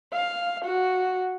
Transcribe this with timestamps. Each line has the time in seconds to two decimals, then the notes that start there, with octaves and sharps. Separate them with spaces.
0.13 F5
0.65 F#4